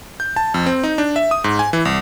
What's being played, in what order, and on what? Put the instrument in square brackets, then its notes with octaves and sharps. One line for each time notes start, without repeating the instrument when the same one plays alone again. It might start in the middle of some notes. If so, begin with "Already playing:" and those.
[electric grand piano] G6
A5
F2
C4
D#4
D4
E5
D#6
G#2
G#5
E3
C2